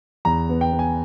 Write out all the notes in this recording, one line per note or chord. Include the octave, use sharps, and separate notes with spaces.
E2 A#5
B3
G5
B3
G#5